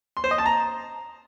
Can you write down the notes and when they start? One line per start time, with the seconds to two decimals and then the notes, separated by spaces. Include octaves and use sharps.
0.17 C6
0.24 C5
0.31 D#5
0.38 A5
0.46 A#5